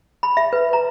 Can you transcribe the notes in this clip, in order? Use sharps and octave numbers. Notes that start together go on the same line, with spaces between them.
B5
E5
B4
A#5